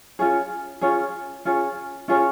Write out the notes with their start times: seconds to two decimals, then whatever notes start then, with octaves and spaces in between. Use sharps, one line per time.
0.19 C#4 F4 G#4 C#5
0.81 C#4 F4 G#4 C#5
1.45 C#4 F4 G#4 C#5
2.08 C#4 F4 G#4 C#5